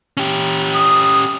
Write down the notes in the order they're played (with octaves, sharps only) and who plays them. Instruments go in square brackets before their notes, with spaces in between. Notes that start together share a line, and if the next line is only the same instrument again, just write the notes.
[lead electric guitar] C#4 G4
[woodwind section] D#6